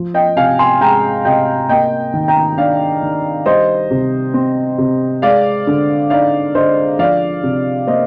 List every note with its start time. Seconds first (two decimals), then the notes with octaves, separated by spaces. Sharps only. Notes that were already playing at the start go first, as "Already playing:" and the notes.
Already playing: F3
0.14 D#5 G5
0.37 C3 F5 G#5
0.59 G#5 C6
0.81 G#3 G5 A#5
1.25 C3 D#5 G5
1.69 A#3 D#5 G5
2.14 D#3
2.28 G5 A#5
2.57 D4 D5 F5
3.02 D#3
3.46 G3 C5 D#5
3.90 C3
4.34 C4
4.78 C3
5.22 G#3 D5 F5
5.67 D3
6.10 D#4 D5 F5
6.55 D3 C5 D#5
6.99 F3 D5 F5
7.43 C3
7.87 A#3 C5 D#5